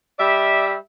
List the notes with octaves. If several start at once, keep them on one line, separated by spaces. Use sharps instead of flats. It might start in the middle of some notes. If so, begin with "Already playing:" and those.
G3 D5 E5